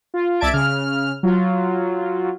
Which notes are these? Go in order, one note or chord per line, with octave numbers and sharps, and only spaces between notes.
F4
C2 D5 E5 A5 G#6 D7
C#3 F6
F#3 F4